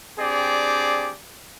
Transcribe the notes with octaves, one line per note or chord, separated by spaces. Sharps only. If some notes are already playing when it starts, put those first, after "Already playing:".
C4 D4 G4 G#4 D5